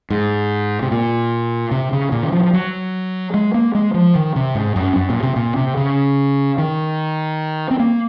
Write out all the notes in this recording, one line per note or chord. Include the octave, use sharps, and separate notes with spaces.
G#2
C3
A#2
C3
C#3
A#2
D#3
F3
F3
F#3
G#3
A#3
G#3
F3
D#3
C3
G#2
F#2
F#2
A#2
C3
A#2
C3
C#3
D#3
C4
A#3